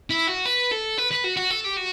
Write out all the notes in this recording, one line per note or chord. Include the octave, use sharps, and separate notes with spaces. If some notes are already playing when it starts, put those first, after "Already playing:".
E4
F#4
B4
A4
B4
B4
F#4
F#4
A4
G4
F#4